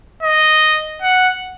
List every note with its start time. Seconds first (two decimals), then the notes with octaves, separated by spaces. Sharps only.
0.23 D#5
1.02 F#5